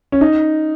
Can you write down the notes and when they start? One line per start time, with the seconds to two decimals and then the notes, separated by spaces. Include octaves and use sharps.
0.12 C#4
0.21 D#4